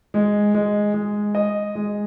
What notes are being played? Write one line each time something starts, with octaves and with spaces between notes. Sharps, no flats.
G#3
G#3
G#3
D#5
G#3